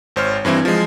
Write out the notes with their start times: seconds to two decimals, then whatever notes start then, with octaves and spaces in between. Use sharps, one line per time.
0.16 G#1 C5 C#5 F6
0.45 G2 E3 C4 E4
0.65 F3 G#3